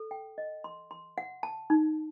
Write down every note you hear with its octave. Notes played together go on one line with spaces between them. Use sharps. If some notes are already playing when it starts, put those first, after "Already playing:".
Already playing: A4
G5
D#5
C6
C6
F#5
A5
D#4